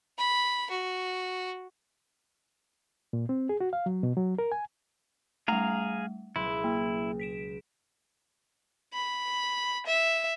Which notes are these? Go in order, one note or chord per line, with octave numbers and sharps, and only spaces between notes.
B5
F#4
A#2
C4
G#4
F#4
F5
F#3
B2
F#3
A#4
G#5
G3 A3 G#4 F5 A#5
C#2 B2 F#3 E4 C6
A#3
B6 D7 E7
B5
E5